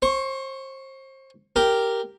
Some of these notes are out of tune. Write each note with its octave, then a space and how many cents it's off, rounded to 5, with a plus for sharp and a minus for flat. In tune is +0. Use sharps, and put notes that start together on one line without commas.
C5 +30 C#6 +0
G4 +0 A#4 -5